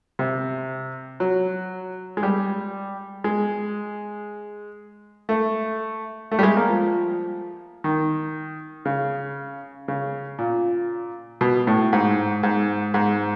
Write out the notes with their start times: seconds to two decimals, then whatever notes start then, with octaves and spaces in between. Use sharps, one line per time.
0.19 C3
1.20 F#3
2.17 G#3
2.23 G3
3.24 G#3
5.29 A3
6.31 A3
6.39 G3
6.43 G#3
6.57 A#3
6.69 F3
7.84 D#3
8.85 C#3
9.88 C#3
10.39 A#2
11.41 B2
11.67 A2
11.93 G#2
12.43 G#2
12.94 G#2